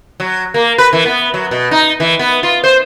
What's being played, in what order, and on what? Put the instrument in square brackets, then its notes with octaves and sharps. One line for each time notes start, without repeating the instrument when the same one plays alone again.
[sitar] F#3
A#3
B4
E3
B3
F#3
B2
D#4
E3
B3
F4
C5